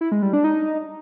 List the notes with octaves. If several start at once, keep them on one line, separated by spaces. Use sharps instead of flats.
E4
G#3
G3
D4
D#4